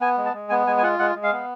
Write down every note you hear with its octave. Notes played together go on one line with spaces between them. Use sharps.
B3 G#5
G#3
A5
G#3
B3 G#5
G#3 G#5
G#5
F4 F#5
G#3 F#5
G#3
F5
B3